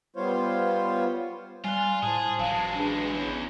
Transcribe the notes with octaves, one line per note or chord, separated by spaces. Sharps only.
G3 B3 F4 C5 C#5 F5
G3 F4 G#5 F#6
A2 G#4 C5 A5
A1 F#3 G#3 F5 A5
D4 G#4 B4
E2 C#4